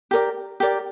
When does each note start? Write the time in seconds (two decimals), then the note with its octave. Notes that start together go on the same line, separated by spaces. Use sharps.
0.11 G4 A#4 D5
0.60 G4 A#4 D5